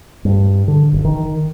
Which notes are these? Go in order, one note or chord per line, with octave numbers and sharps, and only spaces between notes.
G2
D3
F#1
D#3